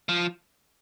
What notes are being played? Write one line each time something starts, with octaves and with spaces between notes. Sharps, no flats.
F3